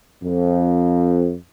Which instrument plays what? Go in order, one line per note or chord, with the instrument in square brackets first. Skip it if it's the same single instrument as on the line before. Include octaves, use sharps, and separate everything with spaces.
[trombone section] F2